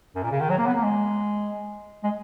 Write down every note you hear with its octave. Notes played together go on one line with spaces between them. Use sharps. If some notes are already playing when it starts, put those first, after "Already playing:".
F#2
A#2
C#3
D#3
F#3
A#3
B3
A#3
G#3
G#3